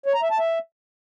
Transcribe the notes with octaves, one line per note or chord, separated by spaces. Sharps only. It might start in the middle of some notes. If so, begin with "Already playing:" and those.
C#5
A#5
E5
A5
E5